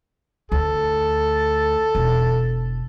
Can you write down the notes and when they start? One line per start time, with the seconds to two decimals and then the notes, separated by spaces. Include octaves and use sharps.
0.52 D2 A4
1.95 E1